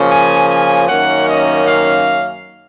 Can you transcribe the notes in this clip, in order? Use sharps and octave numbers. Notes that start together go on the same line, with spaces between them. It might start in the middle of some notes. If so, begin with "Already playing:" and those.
Already playing: C#3 F3 A#3 C#4
G#5
G#5
F#2 D#3 A#3 C#4 F#5
D#5
F5